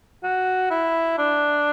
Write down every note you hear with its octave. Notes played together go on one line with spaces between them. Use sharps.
F#4
E4
D4